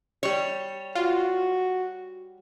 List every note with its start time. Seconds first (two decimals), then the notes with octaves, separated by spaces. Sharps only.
0.23 G3 C#5
0.95 F4 F#4